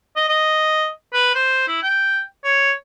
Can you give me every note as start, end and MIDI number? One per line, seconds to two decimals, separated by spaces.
0.16 0.26 75
0.29 0.89 75
1.13 1.31 71
1.35 1.68 72
1.68 1.80 64
1.83 2.20 79
2.44 2.72 73